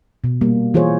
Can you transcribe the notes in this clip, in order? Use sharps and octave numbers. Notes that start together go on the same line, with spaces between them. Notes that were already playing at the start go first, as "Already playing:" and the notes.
B2
G3 A#3
E3 F4 G#4 C5 C#5